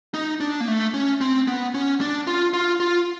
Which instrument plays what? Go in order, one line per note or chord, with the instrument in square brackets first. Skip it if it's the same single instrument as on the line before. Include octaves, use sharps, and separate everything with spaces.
[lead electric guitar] D#4
D4
A#3
A3
C#4
C4
B3
C#4
D4
F4
F4
F4